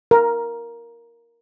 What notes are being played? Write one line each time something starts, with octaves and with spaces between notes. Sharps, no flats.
A#4